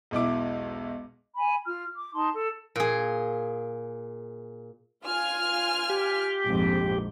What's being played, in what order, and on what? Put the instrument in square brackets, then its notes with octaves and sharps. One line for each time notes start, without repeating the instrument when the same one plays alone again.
[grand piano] E1 B1 E4 D6
[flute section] G#5 B5
F4 F6
D6
D#4 A5 C6
A4
[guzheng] A#2 G#4
[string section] F4 G#5 F6
[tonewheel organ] G4
[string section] A#1 F2 G#2